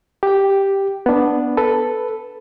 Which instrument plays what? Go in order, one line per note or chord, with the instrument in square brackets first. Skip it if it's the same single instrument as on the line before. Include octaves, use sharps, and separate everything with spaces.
[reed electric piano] G4 G5
B3 D4
A4 B4